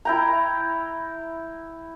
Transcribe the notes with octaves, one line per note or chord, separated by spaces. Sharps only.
E4 G5 A#5